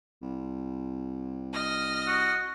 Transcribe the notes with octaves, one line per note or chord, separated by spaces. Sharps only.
C2
D#5 F6 A#6
F#4